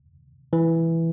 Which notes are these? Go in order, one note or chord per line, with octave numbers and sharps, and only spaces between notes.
E3